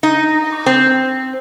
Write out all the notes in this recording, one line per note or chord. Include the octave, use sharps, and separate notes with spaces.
D#4
C4